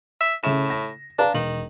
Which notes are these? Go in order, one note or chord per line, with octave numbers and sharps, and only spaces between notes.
E5
A2 C#3 E5 E7
A#6
D4 B4 F5 A#5
E1 D#3 F#7